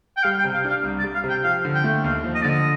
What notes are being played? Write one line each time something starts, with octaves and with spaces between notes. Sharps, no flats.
G5
G3 F5
G5
C3
F5
D4 F5
C2
D5
G3
F5
C3
G5
F3 F5
D3
G5
A3
D#2 F5
F3
D#5
D3 D5
D#5